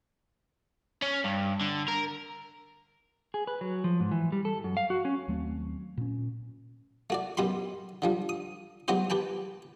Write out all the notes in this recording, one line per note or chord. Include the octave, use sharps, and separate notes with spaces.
C#4
G2
D3
A#4
G#4
B4
F#3
F3
G#2
E3
G3
A4
F#2
F5
F#4
C#4
D#2 F#3 A3 C4
A#2 C#4
A3 F#4 D5
F#2 B2 G4 B5 C6
D3 F3 G3
D#6
F#3 G#3 B3 F#4 G4 C5
G4 B4 G5 A5